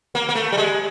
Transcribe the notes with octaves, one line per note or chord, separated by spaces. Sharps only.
A#3
A#3
A3
G3
G#3